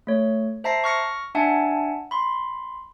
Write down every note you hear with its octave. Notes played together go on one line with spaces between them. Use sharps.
A3 C#5
C5 E5 A5 A#5 A#6 C7
C#6 F6 A#6 C#7
D4 E5 F#5 G#5 A5
B5 C6